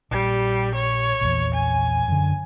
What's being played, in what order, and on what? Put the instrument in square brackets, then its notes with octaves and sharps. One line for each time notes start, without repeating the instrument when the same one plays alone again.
[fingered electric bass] A#1 [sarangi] G3
[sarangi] C#5
[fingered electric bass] A#1 E2
[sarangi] G#5
[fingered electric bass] F#2 D3